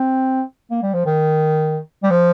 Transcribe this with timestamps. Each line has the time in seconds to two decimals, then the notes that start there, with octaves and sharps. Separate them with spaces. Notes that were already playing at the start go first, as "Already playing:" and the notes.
Already playing: C4
0.71 A#3
0.83 G3
0.93 F3
1.06 D#3
2.03 G3
2.10 F3